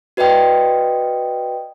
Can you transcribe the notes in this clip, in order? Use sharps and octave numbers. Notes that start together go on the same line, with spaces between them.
F#4 B4 D5 D#5 G5 D#6